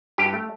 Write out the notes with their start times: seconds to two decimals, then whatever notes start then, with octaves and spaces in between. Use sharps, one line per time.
0.18 G2 G4
0.34 A3